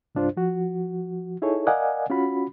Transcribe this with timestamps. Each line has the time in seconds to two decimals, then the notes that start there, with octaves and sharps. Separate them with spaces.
0.15 C2 G2 D4 F4 C5
0.37 F3 F#4
1.42 D#4 E4 G#4 A4 C#5
1.67 A#4 D5 D#5 F5 F#5 G#5
2.10 C#4 F4 F#4 B5